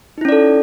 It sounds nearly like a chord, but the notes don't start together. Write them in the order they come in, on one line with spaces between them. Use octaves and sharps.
D#4 E4 C#4 D5 A4